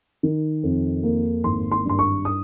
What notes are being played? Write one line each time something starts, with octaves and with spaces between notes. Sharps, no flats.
D#3
F2
A#3
G#1 C6
C6
G2 C6
C#6
D#6